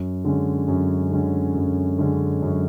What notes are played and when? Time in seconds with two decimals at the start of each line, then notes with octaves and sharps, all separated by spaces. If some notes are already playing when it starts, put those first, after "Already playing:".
Already playing: F#2
0.24 D3 G#3 C#4
0.68 F#2
1.12 D3 G#3 C#4
1.55 F#2
1.98 D3 G#3 C#4
2.42 F#2